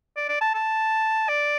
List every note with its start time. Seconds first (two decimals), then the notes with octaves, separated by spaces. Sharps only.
0.16 D5
0.29 D5
0.41 A5
0.54 A5
1.29 D5